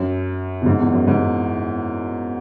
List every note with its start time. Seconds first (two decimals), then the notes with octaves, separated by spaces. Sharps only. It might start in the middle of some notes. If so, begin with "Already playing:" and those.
Already playing: F#2
0.62 B2
0.66 G#2
0.80 E2
0.93 F#2
1.07 G#2